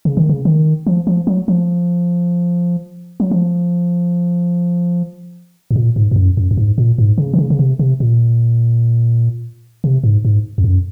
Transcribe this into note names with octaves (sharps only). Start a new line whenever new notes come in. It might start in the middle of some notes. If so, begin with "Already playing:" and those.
C#3
D#3
C#3
D#3
F3
F3
F#3
F3
F#3
F3
G#2
A#2
G#2
G#2
F#2
F#2
F#2
G#2
A#2
G#2
C#3
D#3
C#3
C#3
C3
C3
A#2
C3
G#2
G#2
F2
F#2